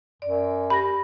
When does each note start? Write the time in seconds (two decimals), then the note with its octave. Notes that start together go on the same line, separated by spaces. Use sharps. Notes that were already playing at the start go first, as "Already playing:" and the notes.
0.22 F#2 D5
0.70 G4 B5 A#6